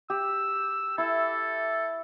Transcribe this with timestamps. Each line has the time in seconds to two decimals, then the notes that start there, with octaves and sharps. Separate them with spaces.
0.10 G4 E6
0.98 E4 A4